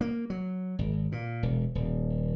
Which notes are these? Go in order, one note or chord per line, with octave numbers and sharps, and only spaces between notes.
A#3
F#3
G#1
A#2
E1
D#1